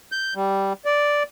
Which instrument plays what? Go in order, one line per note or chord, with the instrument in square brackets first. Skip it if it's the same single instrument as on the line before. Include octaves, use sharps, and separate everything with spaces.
[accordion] G6
G3
D5